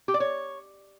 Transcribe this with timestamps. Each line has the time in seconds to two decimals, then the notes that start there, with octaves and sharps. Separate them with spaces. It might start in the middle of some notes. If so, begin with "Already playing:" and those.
0.08 G4
0.14 D5
0.20 C#5